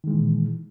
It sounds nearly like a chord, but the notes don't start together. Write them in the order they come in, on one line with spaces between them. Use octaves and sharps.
D#3 G#3 E3 A#2